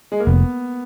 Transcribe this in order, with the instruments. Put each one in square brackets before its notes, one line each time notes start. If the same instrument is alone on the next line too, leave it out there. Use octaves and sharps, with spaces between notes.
[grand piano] G#3
A#3
[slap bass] F1 [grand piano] B3